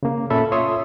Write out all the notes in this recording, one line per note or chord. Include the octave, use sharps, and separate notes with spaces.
C#3 A#3
A#2 C#4 A4 E5 B5
F4 C#5 E5 C6 D#6